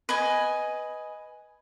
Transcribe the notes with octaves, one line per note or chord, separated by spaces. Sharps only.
B4 D#5 G#5